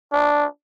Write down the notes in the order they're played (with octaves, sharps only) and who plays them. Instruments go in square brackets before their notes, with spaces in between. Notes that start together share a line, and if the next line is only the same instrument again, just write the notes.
[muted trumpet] D4